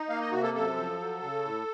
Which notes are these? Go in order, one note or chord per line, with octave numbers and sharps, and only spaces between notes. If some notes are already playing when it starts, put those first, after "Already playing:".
Already playing: D#4
A#3 F5
D#5
C3 F#4
A4
F#2 A4
F3
F#3
C#3
A2